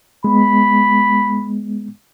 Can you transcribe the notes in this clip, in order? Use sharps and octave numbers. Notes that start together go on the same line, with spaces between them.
G#3 B3 B5